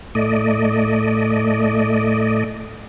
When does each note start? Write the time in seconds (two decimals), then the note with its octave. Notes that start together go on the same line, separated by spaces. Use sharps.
0.15 A2 A3 D5 D#5